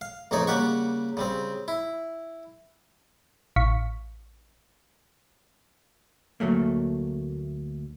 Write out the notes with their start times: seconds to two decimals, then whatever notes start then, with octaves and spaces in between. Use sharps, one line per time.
0.01 F5
0.31 A1 F2 C#3 D#4 C#5 D5
0.47 C#3 G3 A#3 G4 F#5 C#6
1.17 C#3 G3 C4
1.68 E4
3.56 A1 F5 C#6 B6
6.40 D2 G#2 F#3 A3 A#3